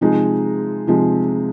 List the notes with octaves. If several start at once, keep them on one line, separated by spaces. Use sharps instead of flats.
C3 F3 G#3 D#4
C3 F3 G#3 D#4